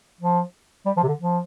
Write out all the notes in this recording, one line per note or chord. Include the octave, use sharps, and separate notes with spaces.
F3
G3
F3
C3
D3
F3